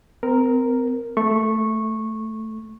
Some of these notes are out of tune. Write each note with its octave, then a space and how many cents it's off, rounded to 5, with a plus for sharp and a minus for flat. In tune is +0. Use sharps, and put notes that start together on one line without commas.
C4 -35 A#4 +0
A3 +0 C#6 -15